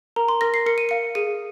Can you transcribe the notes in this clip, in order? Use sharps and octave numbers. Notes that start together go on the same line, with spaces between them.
A#4 A#5
C6
A#4 A#6
C7
A#4 C#7
D#7
F5 C#7
G#4 D#7